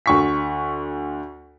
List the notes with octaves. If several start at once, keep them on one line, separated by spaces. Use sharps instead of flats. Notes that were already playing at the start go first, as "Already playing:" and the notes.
D2 C#6 B6